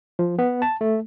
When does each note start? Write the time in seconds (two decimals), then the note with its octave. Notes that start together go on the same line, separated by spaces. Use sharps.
0.19 F3
0.39 B3
0.62 A5
0.81 A3